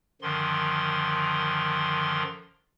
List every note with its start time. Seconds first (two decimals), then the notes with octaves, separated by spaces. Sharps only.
0.22 F#2 D3 D#3 F3 C6